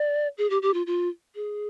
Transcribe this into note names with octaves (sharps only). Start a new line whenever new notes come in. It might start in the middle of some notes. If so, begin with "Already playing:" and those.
Already playing: D5
G#4
G4
G4
F4
F4
G#4